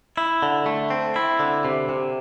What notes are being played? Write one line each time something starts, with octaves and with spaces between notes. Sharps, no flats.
E4
D3
A3
C4
E4
D3
C3
C3